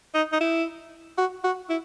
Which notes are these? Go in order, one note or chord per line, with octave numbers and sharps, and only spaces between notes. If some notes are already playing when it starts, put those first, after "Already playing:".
D#4
D#4
E4
F#4
F#4
E4